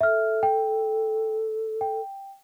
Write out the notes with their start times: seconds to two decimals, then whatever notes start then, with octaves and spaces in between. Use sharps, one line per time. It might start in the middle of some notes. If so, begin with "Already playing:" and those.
0.01 A4 E5 F6
0.43 G5
1.81 G5